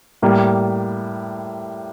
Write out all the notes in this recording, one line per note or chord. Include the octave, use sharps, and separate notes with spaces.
A2 G3 A#3